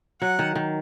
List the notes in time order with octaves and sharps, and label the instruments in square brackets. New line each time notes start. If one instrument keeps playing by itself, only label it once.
[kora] F#3 [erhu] F#5
[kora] D#3
D#3